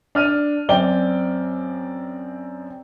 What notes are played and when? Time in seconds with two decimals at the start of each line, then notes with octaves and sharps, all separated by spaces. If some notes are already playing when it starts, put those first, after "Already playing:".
0.15 D4 F6 D#7
0.69 F#2 C4 D5 G5 G7